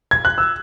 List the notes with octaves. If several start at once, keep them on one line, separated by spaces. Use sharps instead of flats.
G#6
F#6
E6